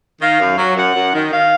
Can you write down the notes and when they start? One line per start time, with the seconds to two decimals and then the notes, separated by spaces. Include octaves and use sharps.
0.20 D#3 F5
0.39 F#2
0.57 F#3
0.76 F#2 F#5
0.95 F#2
1.13 D#3
1.31 D#3 F5